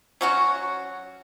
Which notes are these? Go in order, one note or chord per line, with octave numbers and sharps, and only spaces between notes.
F#3 C#4 F#4